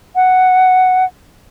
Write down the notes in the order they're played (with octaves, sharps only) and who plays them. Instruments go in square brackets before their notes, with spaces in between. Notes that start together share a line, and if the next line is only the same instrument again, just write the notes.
[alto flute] F#5